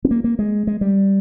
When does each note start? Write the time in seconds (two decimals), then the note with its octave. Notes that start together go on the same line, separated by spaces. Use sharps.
0.05 C4
0.11 A#3
0.24 A#3
0.39 G#3
0.67 G#3
0.81 G3